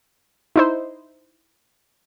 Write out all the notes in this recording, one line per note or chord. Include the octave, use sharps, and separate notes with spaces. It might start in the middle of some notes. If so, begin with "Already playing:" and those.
D#4 E4 C5